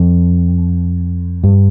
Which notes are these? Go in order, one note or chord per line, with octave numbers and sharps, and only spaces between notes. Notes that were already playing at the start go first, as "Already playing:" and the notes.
Already playing: F2
G2